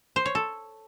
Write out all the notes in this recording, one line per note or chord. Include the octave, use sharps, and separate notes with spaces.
C5
C#5
A4